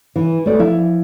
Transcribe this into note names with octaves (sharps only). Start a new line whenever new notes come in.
E3
A3 D5
F3 E4